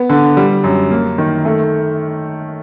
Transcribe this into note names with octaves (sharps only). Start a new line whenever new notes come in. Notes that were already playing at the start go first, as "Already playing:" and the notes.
Already playing: B3
D3
G3
F#2
A#3
D#3
A3